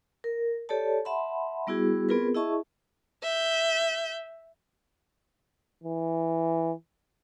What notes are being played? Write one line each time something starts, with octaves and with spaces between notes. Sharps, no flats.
A#4
G4 A4 C#5 D5 A5
E5 F#5 A5 B5 C6
G3 B3 E4 F#4 G#4
B3 C4 F4 G#4 A#4 B4
E4 G#4 D#5 E5 A5 C#6
E5 G6
E3